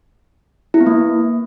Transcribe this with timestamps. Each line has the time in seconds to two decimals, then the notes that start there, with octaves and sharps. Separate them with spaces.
0.74 E4
0.80 B3
0.86 A#3